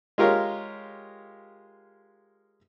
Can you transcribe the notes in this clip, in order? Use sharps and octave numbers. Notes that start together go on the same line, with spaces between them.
G#3 F4 G4 A#4 C#5 F5